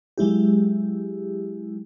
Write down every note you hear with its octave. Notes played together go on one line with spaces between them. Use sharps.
F#3 G#3 E4 G4